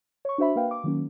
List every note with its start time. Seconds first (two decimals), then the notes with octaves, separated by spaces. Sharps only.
0.25 C#5 C#6
0.38 D4 F#4 C5 E5 B5
0.56 A#3 B4 F5 G5
0.71 D6
0.84 D#3 F#3 A#3 C#4